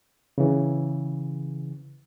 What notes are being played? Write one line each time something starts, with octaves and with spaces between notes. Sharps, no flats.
C#3 E3